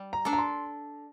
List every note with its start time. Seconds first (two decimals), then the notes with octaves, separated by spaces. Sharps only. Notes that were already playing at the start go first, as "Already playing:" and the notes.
Already playing: G3
0.13 A#5
0.25 D4 A4 D5
0.33 A#5
0.38 C6